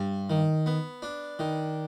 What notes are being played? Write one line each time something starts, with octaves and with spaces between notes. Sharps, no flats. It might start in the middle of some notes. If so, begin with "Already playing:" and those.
Already playing: G2
D#3
B3
D4
D#3